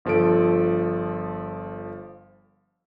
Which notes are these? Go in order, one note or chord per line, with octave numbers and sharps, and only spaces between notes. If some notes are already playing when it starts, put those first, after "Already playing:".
G1 F3 A4 D7